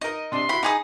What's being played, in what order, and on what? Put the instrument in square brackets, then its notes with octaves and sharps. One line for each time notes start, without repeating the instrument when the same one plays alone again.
[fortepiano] D#4 A#4 [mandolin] D#5
[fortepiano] C3 D4 [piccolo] C6
[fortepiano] E4 F#4 [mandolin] B5
[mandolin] D#4 G#4 D#6 [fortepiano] B5 D6